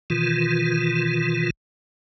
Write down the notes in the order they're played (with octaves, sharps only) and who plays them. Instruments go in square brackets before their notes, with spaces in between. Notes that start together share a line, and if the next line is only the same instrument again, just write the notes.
[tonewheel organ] B2 D#3 E3 F4